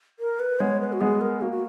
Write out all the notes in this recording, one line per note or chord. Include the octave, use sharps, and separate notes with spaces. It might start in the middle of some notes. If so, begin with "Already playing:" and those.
A#4
B4
G#3 B3 C#5
B4
F#4
G#3 B3 G#4
A#4
A#3 F#4
F#4